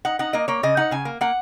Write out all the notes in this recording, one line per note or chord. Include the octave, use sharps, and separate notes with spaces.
D#4 F#5
D#4 F#5
A#3 D#5
A#3 C#5
C#3 D#5
D#4 F#5
C#3 G#5
A#3
A#3 F#5